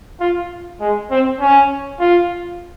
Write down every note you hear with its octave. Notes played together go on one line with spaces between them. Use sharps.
F4
G#3
C4
C#4
F4